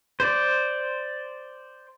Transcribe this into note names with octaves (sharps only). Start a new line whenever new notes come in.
C5 D5